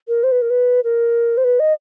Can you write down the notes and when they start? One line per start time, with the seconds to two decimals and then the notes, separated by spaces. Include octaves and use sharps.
0.08 A#4
0.24 C5
0.32 B4
0.42 A#4
0.50 B4
0.84 A#4
1.37 C5
1.44 B4
1.60 D#5